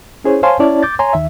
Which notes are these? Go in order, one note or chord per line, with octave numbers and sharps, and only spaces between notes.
C#4 E4 G#4 C5 C#5
C5 C#5 F5 G#5 A5 C6
C#4 E4 C#5 D5 A5
D6 G6 A6
C#5 G#5 A#5 C6
D#2 D#3 E5